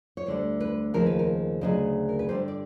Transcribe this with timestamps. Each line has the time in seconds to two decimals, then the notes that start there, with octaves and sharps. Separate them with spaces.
0.17 C#5
0.26 D2 D3 G3 C5
0.60 B4
0.94 D#2 C#3 F3 A#4
1.06 B4
1.19 A#4
1.61 D2 C#3 F#3 D#5
2.09 A#4
2.19 B4
2.29 G2 D3 G3 C5
2.48 D5